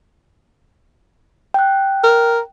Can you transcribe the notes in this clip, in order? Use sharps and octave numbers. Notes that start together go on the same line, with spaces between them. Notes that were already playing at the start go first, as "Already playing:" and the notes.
G5 F#6
A#4